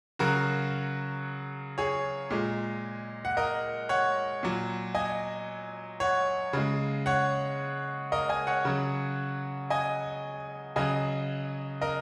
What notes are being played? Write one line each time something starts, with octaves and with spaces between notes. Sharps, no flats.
C#3 F#3 F#4 A#4
G#4 C#5
A#2 G#3
F#5
A#4 D#5
C#5 F#5
A#2 F#3
D#5 G#5
C#5 F#5
C#3 G#3
C#5 F#5
A#4 D#5
D#5 G#5
C#5 F#5
C#3 F#3
D#5 G#5
C#3 F#3 D#5 G#5
A#4 D#5